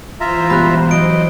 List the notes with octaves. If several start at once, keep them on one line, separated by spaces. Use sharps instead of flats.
E3 F4 C5 E5 A#5
C#2 B2 G3 B5 F#6
F#3 D#5 D7